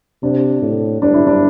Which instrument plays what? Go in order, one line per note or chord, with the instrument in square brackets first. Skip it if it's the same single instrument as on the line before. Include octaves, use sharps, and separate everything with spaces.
[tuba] C3 [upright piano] D4
[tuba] A2
[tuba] G2 [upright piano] D4
[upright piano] E4
D4